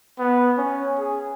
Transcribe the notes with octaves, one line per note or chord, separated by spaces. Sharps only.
B3
C#4
G#4